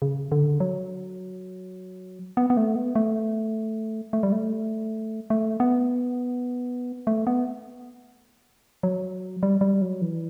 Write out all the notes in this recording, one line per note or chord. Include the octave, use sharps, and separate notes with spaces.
C#3
D3
F#3
B3
B3
A3
B3
A3
A3
G3
A3
A3
B3
A3
B3
F#3
G3
G3
F#3
E3